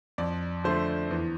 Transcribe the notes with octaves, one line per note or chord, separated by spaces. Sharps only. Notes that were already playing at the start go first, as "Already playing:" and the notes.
F2 D5
D3 F3 A3 C5
E2